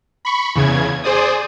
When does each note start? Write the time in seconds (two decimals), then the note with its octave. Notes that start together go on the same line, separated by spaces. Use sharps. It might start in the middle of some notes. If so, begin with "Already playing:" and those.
0.25 B5 C#6
0.55 E2 C#3 G#6
1.04 G#4 C5 D5 D#6